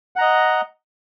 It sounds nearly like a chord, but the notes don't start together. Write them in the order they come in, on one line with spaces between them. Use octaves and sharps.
F#5 A#5 D#5